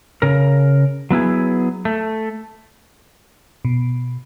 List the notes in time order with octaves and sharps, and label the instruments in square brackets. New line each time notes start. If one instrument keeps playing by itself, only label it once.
[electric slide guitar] C#3 A#4
F#3 B3 E4 G#4
A3
[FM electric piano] B2